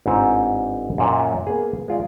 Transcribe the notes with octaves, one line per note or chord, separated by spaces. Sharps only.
G1 G#2 C4 C5 F#5
F#2 A#2 D#5
A#3 B3 G#4
G#3 F4 D5